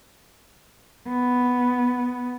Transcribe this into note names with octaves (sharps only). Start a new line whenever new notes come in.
B3